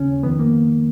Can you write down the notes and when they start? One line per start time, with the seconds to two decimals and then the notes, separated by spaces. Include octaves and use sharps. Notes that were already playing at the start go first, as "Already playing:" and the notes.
Already playing: D#2 C#3 C#4
0.23 F2 D#3 B3
0.39 A#3